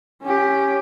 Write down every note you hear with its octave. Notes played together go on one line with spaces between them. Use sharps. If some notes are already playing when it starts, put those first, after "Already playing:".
C#4 G4